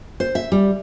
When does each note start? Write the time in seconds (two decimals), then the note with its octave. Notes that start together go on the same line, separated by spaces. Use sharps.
0.20 C5
0.35 E5
0.52 G3